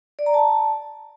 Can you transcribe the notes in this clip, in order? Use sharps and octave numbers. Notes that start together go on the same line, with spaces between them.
D5
A#5
A5